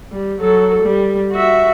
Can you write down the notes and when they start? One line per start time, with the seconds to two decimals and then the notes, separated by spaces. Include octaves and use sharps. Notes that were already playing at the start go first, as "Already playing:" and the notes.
0.11 G3
0.41 F#3 A4
0.82 G3
1.32 F#4 E5